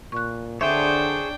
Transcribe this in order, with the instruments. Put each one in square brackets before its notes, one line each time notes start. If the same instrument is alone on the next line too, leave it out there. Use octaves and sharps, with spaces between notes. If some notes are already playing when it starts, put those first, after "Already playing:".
[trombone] A#2 [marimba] C#6 F#6
[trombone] D3 [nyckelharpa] D4 G5 [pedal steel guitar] G#4 C5 C#5 [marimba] E5